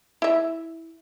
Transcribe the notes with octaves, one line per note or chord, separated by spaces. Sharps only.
E4 E5